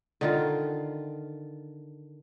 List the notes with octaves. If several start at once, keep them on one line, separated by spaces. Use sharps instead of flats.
D3 D#3 F4